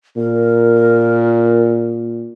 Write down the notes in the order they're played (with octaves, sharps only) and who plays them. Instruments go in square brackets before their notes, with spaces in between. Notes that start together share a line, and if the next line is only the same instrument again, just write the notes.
[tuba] A#2 [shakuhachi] A#4